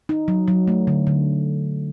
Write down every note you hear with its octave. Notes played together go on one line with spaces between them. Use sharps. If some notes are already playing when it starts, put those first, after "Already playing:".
D#4
F#3
F#3
A3
D3
D3